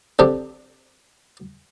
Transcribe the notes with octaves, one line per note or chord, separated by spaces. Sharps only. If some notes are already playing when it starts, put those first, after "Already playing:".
D3 C4 G4